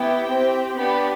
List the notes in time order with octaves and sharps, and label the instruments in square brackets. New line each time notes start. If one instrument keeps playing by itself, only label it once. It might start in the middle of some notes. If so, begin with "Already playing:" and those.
Already playing: [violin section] B3 E4 G4 G5
C4 G4
B3 D4 G4 B5